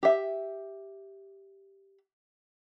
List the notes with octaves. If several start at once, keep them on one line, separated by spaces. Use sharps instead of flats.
G4 E5